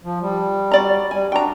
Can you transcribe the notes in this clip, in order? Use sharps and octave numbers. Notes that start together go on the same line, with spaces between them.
F3
G3
F#4 D5 A#5
G3 G#5
D4 F#4 G5 A#5